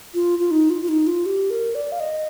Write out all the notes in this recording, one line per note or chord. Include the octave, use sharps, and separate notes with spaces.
F4
F4
D#4
F4
F4
D#4
F4
G4
A#4
D5
F5
D#5